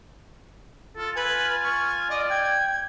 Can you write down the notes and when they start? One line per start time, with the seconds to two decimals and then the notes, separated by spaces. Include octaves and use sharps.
0.97 F4 A4
1.16 B4 G#5
1.63 C#6
2.10 D5 D#5
2.30 G5 G#6